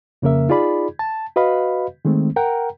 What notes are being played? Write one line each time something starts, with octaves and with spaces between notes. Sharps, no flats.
F2 C#3 A#3 A#4 E5
D#4 F4 G#4 D5 B5
A5
F#4 B4 D#5 F5 B5
D#3 G#3 A3 C4
A#4 F#5 G5 A#5